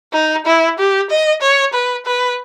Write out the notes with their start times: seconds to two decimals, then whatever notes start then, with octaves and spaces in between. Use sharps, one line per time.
0.13 D#4
0.46 E4
0.78 G4
1.10 D#5
1.42 C#5
1.73 B4
2.06 B4